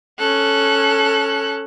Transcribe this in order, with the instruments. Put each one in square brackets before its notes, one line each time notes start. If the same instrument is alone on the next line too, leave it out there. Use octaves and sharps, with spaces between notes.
[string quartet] C#4 A4 F#6